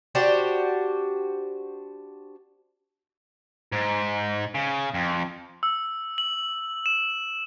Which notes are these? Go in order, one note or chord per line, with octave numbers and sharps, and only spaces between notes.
D4 F#4 G4 C5
G#2
C#3
F2
E6
F#7
E7